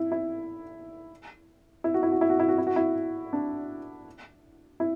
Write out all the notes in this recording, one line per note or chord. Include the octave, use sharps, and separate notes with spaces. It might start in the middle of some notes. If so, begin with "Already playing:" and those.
Already playing: E4
E4
E4
F#4
E4
F#4
E4
F#4
E4
F#4
E4
F#4
E4
D4
E4